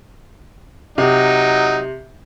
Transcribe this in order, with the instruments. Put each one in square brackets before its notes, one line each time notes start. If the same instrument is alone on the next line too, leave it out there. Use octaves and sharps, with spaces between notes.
[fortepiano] C3 [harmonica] F#3 D#4